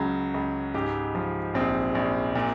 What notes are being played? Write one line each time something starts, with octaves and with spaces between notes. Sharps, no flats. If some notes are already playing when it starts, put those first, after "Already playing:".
Already playing: C#2 C#3 F#3
C#2
G#2 G4
F3
A#1 C4
A#1
A#2